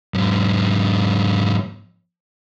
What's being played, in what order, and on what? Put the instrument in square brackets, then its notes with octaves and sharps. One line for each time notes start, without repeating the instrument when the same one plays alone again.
[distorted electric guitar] G#2 F#3